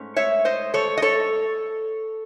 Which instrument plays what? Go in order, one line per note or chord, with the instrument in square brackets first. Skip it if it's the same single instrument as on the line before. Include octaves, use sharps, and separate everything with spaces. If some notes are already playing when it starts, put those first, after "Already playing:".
Already playing: [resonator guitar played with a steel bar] G#2 A3 C#4
C#5 E5
C5 D#5
A4 C#5
D#5
A4 C#5